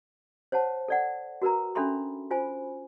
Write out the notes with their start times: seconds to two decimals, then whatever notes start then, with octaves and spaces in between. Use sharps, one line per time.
0.52 C5 C#5 F#5 A5
0.88 A4 D5 F#5
1.42 F#4 A#4 B4 A#5
1.75 C#4 D4 A4 E5 B5 C6
2.31 F4 C5 G#5 B5